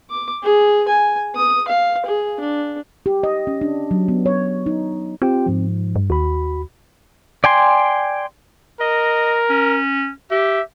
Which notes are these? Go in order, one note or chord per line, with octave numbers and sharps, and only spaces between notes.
D6
G#4
G#5
D#6
F5
G#4
D4
G4
D#5
C#4
D4
F#3
B3
C#5
D#4
C4 F4 G4 G5
G#2 F3
G2
D#2 F#4 B5
D5 G5 G#5 C6
A#4 D#5
C#4
G4 E5